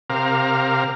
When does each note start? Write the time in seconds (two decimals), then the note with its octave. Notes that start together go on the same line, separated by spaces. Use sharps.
0.10 C3 A#4 F5